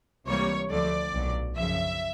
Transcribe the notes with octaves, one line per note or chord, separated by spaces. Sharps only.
C#2 C3 E3 G3 A#3 C#5
D2 D3 F3 A3 D5
B1 A#2 F#3
F#2 C#3 F3 E5